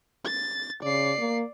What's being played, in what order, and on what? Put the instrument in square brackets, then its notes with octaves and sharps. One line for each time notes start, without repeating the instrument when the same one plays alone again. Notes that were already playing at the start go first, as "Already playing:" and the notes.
[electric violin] A6
[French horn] C#3 [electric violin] D5 C7
[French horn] A#3